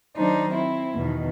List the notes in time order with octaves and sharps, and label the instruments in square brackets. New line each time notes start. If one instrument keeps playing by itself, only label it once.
[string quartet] D#3 F#3 D4 D#4 C5
C4 E4
E2 B2 D#3